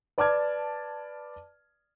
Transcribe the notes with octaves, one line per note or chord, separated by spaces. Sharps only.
B4 D5 A5 D6 F6 G#6